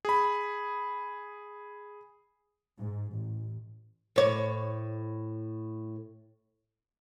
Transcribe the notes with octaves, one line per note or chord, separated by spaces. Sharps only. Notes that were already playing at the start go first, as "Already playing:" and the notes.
G#4 B5
G#2
A1
A2 C#5